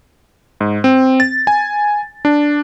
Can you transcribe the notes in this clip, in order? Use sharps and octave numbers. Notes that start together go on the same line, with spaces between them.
G#2
C4
A6
G#5
D4